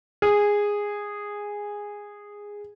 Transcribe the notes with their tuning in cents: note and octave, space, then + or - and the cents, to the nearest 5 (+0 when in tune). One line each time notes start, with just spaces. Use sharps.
G#4 -10